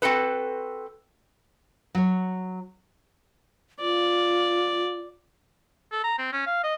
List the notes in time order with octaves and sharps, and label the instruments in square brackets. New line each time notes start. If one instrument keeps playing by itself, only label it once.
[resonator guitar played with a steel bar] C4 F#4 A4 B4
[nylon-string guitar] F#3 C#5
[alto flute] F4 [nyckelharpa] D5
[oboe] A4
A#5
C4
C#4
F5
D#5